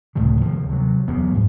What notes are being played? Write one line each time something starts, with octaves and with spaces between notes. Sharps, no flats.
C#2 A2 C3 D#3
D#2 C3 F3
C3 F#3
E2 F#3 A#3 B3
G#2